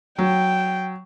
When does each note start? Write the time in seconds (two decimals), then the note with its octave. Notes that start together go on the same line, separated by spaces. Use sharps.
0.18 F#3 G5